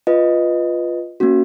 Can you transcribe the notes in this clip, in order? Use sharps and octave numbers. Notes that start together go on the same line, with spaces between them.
F4 B4 D#5
A#3 C#4 F#4